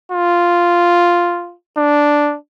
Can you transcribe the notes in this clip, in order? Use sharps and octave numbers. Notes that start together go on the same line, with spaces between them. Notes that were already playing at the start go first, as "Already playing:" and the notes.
F4
D4